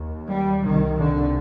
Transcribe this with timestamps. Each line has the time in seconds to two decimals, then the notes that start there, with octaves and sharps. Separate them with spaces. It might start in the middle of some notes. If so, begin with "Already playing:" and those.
Already playing: D#2
0.27 G3
0.62 C2 C3 D#3
0.98 D3